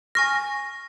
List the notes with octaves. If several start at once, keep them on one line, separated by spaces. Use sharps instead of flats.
G#5 C#6 F6 A#6